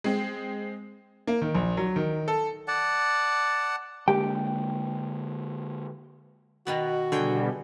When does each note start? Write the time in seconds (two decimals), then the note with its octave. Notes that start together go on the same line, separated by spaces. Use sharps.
0.04 G#3 C4
1.27 A#3
1.42 D#3
1.55 A#1
1.77 F#3
1.96 D#3
2.28 A4
2.68 D5 F#5 A5
4.08 D3 G#3 A#3 G4 G5
6.67 B2 D#3 B3 F#4
7.12 B2 D3 G3 G#4 C#5 G5